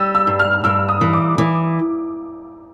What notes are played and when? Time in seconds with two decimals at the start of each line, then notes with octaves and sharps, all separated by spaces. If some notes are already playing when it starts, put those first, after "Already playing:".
Already playing: G3 E6
0.15 E6
0.27 G2
0.39 F6
0.64 G2 E6
0.89 D#6
1.01 E3
1.13 D6
1.38 E3 D6